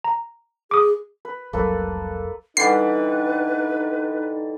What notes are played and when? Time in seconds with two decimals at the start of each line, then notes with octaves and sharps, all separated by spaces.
0.04 A#5
0.71 G#4 D6 D#6
1.25 B4
1.53 F1 C2 F#3 A#3 A4 B4
2.57 D3 E3 G3 D#4 B4 C7